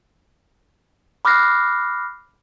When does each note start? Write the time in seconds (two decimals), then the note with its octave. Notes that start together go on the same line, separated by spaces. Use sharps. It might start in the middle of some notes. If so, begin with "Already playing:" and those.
1.25 B5 D6 F6 F#6 A#6 C7